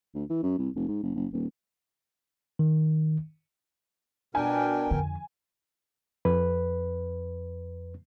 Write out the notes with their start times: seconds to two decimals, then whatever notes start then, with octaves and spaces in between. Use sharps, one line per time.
0.15 D2
0.30 E3
0.43 F#2
0.59 C2
0.76 F1
0.88 G#2
1.03 F#1
1.15 F#1
1.33 D#1
2.59 D#3
4.35 B2 D4 A#4 G5 G#5
4.91 F2 D3
6.25 F2 B4